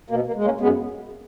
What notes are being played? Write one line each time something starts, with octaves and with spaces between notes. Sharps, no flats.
B2 A#3
A#3
G#3
A#3 C#4
F#2 G#3 B3